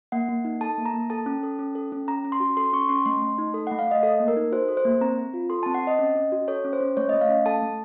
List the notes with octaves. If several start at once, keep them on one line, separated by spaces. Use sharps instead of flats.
A#3 F#5
A#3
D#4
A4 A5
A#3
A#5
A#3
A4 A5
C#4
A4
C#4
A4
C#4
C#4 A#5
C#4
C6
F#4
A4 C6
C#4 C#6
C#4 C6
A3 C6
A3
D#4
A4
A3 F#5
F5
A3 D#5
A4
A#3
A#4
D#4
F#4 C5
A4
C5
A#3
C4 A#5
C4
F4
A4 C6
C4 A5
F#5
C4 D#5
C#4
C#4
F#4
A4 C#5
C#4
C5
C#4
A3 C#5
A3 D#5
F5
C#4
A4 A5
A3